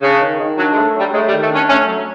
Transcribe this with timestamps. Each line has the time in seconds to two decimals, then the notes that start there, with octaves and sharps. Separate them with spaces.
0.02 C#3 D4
0.21 D#3
0.39 D#3
0.58 F#3 D4
0.72 G#3
0.76 A3
0.95 F#3 G3
1.13 G#3 A3
1.28 G3
1.32 D#3
1.41 A3
1.50 C#4 D4
1.69 A3 C#4
1.87 F#3